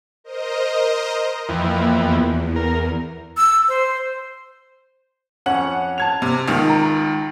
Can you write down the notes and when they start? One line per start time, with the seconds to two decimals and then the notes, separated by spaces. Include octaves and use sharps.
0.24 A#4 C5 D#5
1.49 F2 E3 A#3
1.91 E2
2.56 A#4
3.37 E6
3.68 C5
5.46 F2 C#4 F#5 F#7
5.98 A5 G#6 F7
6.22 C3
6.48 C#2 D#3
6.69 A#5